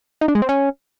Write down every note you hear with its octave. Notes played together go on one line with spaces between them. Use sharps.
D#4
D4
G#3
C4
C#4